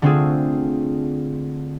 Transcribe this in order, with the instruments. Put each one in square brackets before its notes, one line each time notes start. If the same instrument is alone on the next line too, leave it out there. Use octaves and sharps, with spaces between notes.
[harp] D3 A3 C4 D4 F4 G#4